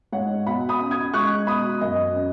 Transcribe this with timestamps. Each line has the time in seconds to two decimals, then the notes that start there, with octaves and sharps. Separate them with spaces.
0.12 G#2 C#5 F#5
0.46 B2 F#5 B5
0.69 B5 D#6
0.80 C#4
0.91 D#6 G#6
1.14 G#3 C#6 F#6
1.47 B2 B5 D#6
1.81 F#2 D#5
2.15 C#4